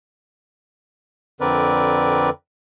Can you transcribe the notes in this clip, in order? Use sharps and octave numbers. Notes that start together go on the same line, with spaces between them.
F2 D3 C4 A#4 B4 D5